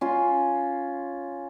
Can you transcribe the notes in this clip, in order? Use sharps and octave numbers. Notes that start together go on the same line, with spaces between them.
C#4 F4 C6